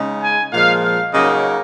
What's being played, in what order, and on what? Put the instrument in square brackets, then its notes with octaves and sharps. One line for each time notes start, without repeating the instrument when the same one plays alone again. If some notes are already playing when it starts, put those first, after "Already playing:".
Already playing: [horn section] C#3 G#3 D#4
G#5
A#2 F3 G#3 F5
F5
C#3 F#3 A#3 D#4 D#5